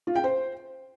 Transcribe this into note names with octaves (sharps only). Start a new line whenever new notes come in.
F4
G5
C5